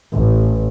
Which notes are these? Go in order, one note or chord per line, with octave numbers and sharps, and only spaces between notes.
A1